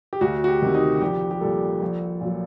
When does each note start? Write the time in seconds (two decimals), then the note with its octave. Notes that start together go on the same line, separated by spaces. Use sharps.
0.13 G4
0.21 D2 F#4
0.44 F#4
0.48 G4
0.62 C3 D#3
0.75 D#4
1.01 A#1 G4
1.31 G4
1.41 A#2 G3 A4
1.82 A#1
2.21 A#2 F#3